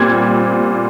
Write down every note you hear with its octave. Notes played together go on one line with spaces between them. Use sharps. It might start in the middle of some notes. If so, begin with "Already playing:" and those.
Already playing: A#2 G3 C4 G#6